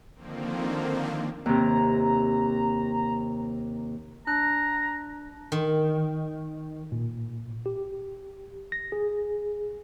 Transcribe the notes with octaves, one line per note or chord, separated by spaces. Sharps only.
D3 D#3 F3 A#3 C4
D#2 C3 A#5
D4 A#5 F#6
D#3
A#2
G4
A#6
G#4